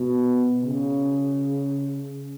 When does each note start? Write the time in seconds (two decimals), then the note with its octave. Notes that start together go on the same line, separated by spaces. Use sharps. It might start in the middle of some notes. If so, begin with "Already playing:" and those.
Already playing: B2
0.64 C#3